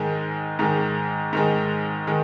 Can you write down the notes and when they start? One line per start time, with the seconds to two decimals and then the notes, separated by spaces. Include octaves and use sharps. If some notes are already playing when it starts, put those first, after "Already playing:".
Already playing: G#2 D#3 G#3
0.59 G#2 D#3 G#3
1.33 G#2 D#3 G#3
2.07 D#3 G#3